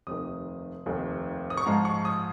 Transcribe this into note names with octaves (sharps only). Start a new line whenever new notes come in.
F1 D#2 D#3 D#6
F1 D#2 D#3
D#6
C#6
G#2 F3 G#3 F4 A#5
C#6
D#6